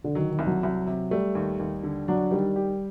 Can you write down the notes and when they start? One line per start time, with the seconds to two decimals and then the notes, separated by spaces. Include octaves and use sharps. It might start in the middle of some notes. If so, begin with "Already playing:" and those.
0.04 D3
0.15 D#3 F#3
0.31 D#3
0.39 C2
0.47 F#3
0.63 C2
0.87 C3
1.11 G3 A3
1.35 D#2
1.59 D#2
1.83 D3
2.08 F#3 D4
2.31 D#3 G3
2.56 G4